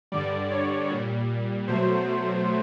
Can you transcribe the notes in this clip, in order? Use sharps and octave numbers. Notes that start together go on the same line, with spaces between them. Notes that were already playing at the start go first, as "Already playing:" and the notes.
G2 D3 G3 D5
C#5
A#2 G3
B2 F#3 A3 C5